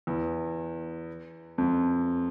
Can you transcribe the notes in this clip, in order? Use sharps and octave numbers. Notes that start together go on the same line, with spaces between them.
E2
F2